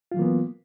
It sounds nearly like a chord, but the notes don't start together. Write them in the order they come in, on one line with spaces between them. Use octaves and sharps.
F4 F#3 E3 A#3 B3